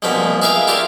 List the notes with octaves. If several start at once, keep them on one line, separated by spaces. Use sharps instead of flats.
C2 G#2 B2 F3 A#3 B5
G#4 A#4 B4 E5 F5 G5
E4 F4 G4 A#4 D5